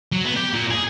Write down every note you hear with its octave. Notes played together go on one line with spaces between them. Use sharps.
F#3
B3
G4
A#2
G#4